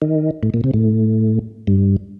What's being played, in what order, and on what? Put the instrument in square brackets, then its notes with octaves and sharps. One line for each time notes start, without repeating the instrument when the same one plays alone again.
[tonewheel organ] D#3
A2
A#2
C3
A2
G2